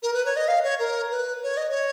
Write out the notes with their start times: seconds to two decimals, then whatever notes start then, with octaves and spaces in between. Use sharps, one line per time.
0.02 A#4
0.13 B4
0.26 C#5
0.36 D#5
0.48 F5
0.63 C#5
0.79 A#4
1.11 B4
1.43 C#5
1.57 D#5
1.70 C#5